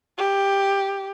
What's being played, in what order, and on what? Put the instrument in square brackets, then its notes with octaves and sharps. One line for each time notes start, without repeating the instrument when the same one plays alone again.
[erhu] G4